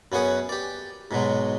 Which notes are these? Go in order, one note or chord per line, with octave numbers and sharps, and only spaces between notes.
F#2 B3 C#4 G#4 F#5 D#6
G4 D5
G#2 B2 F#3 G#3